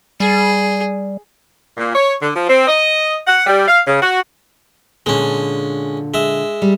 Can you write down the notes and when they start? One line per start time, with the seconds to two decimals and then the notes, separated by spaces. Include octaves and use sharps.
0.20 G3 G#4
1.78 A#2
1.95 C#5
2.21 D3
2.35 F3
2.49 C4
2.68 D#5
3.27 F#5
3.47 G3
3.67 F5
3.87 C#3
4.01 F#4
5.06 A#2 D3 G#3 C#4
6.14 G#3 E5
6.62 G3